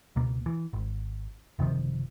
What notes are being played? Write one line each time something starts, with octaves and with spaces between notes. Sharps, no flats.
C#2 B2 A#3
E3
G#1
F#1 C3 D#3 F3